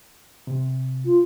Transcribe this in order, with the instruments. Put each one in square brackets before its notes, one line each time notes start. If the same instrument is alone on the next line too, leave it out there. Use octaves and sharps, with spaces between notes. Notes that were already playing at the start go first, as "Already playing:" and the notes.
[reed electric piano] C3
[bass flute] F4